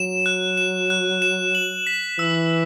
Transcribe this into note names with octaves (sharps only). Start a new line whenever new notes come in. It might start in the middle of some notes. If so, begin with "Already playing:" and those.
Already playing: F#3 E7
F#6
E7
F#6
E7
F#7
B6
E3 E6